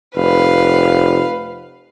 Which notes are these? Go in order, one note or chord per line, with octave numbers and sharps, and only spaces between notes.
F1 B4 F5